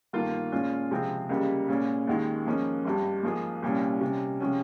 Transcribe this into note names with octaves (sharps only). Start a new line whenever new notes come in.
G1 G2 D#3 A#3 F4
A#2 G#3 C#4 F4
C#2 C3 F3 G#3 C4
C#2 C#3 G3 A#3
A#2 G#3 C#4
D#2 D#3 G#3
G#2 F3 A#3 C#4
G#1 G2 G3
G#2 F3 A#3 F4 G#4
C2 A#2 G3 C#4
C3 G3 C#4
C3 F3 G#3 C#4